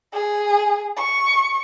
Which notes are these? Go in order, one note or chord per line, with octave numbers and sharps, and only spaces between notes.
G#4
C#6